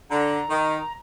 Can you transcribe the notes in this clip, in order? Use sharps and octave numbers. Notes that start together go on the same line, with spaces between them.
D3 A#5
D#3